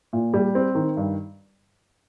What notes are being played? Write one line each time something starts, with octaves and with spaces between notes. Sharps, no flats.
A#2
G3
C4
D#3
G2